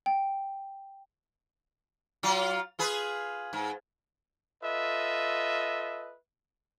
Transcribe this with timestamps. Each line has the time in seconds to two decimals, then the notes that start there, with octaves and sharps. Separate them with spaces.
0.06 G5
2.23 F#3 F4
2.79 F4 G#4 B4
3.53 G#2
4.64 F4 A4 B4 D#5 E5